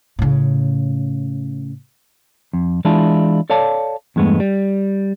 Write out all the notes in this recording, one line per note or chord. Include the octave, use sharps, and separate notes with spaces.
A2 C#3
F2
E3 G#3 D4 E4 F4 A5
A4 C#5 D5 F5 A5
E2 G2 G#3 A3 B3
G3